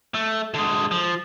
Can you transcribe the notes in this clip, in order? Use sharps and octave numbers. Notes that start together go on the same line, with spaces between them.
A3
D3 G#3
F3